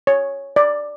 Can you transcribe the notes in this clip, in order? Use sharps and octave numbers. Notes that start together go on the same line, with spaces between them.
C#5
D5